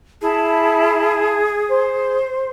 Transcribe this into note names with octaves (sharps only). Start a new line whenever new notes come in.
E4 G#4 A5
C5